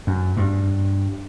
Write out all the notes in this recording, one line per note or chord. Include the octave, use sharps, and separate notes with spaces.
F#2
G2